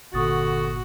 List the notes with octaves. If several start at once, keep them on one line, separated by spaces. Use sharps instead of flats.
G1 A#2 D3 F#4 C#6 D#6 A6